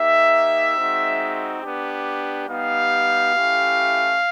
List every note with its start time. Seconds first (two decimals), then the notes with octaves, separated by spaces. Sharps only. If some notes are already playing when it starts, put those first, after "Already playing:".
Already playing: A#3 D#4 G4 E5
0.77 G#3 C4 D#4 F#4
1.63 B3 D4 G4
2.49 G3 B3 D#4 G4 F5
3.35 A3 C#4 E4 G4